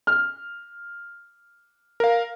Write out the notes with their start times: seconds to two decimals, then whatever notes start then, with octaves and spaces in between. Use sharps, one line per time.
0.07 F6
2.00 A#4 F5